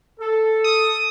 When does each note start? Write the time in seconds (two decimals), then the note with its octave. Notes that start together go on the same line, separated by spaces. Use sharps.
0.20 A4
0.64 D#6